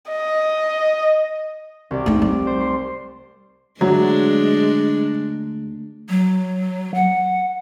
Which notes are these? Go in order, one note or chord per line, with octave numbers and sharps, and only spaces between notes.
D#5
C2 D5
A3 D#4
G3 D5
C5
C6
D2 F#3 G#3 D4
F#3
F#5